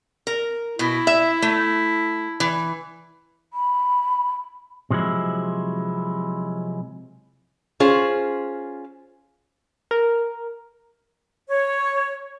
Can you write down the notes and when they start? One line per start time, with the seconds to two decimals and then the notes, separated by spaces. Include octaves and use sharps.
0.27 A#4
0.79 B2 E4
1.07 E5
1.42 A3
2.40 E3
3.53 B5
4.90 C3 F3 F#3 G#3 E4
7.80 C#4 F4 G#4 C5
9.91 A#4
11.49 C#5